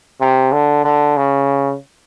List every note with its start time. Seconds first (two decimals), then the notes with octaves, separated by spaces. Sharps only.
0.21 C3
0.52 D3
0.85 D3
1.17 C#3